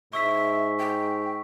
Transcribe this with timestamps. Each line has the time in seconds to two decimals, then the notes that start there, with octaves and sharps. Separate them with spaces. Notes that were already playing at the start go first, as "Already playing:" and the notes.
0.13 G#2 E5 C#6 E6 B6
0.79 G5